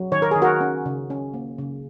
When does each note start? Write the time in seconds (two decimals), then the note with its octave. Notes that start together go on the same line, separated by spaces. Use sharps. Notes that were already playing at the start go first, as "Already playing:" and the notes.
Already playing: F#3
0.12 D#3 C#5
0.22 A#4
0.31 D#3 G#4
0.42 F#4 A#4
0.61 C#4
0.86 C#3
1.10 C#4
1.34 A#3
1.58 C#3